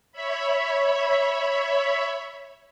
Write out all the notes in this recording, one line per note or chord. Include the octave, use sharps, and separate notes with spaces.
C#5 E5 B5